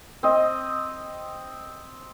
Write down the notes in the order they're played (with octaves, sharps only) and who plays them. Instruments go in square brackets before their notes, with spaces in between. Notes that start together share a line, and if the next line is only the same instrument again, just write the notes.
[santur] C4 D#5